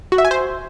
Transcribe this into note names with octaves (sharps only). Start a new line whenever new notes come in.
F#4
E5
G#5
C5